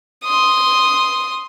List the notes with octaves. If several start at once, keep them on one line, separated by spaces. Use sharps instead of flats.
C6 D#6